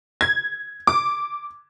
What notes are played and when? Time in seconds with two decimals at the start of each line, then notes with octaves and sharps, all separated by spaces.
0.21 G#6
0.87 D6